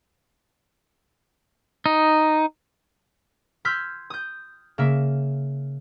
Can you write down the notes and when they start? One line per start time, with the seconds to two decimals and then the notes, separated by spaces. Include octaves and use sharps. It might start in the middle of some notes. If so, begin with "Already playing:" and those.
1.86 D#4
3.65 C6 E6 F6 G6 G#6 B6
4.10 D#6 G6
4.78 C#3 A#3 E5